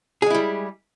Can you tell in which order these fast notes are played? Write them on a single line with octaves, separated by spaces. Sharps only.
G#4 G#3 E4 G3